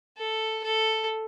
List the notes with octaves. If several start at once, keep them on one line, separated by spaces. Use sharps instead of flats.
A4
A4